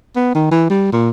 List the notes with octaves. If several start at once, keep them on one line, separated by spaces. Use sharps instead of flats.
B3
D#3
E3
G3
A#2